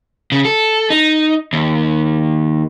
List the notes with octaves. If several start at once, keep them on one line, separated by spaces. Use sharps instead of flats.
C#3
A4
D#4
D#2